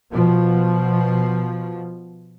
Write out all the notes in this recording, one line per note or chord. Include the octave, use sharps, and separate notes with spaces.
B2 F3